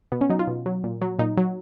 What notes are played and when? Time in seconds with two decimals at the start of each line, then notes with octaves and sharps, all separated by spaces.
0.12 B2 B3
0.21 C#4
0.30 F#3 D#4
0.39 F4
0.47 B2
0.66 F#3
0.84 A#2
1.01 F#3
1.19 A#2 D#4
1.37 F#3